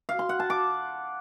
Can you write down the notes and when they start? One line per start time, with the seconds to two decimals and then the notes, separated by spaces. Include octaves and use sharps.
0.09 F5
0.19 C6
0.29 F#5
0.40 A5
0.50 D6